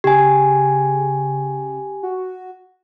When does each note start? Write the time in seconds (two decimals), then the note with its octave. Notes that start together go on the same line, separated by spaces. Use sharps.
0.04 C#3 G4 G#5
2.03 F#4